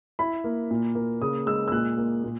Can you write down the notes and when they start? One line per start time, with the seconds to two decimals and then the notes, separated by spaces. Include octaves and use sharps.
0.19 E4 B5
0.44 A#3
0.71 A#2
0.95 A#3
1.22 C#3 D#6
1.46 G#3 E6
1.68 E6
1.72 A#2 F#6
1.98 A#3
2.24 A#2